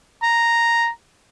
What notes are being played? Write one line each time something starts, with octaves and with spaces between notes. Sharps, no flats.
A#5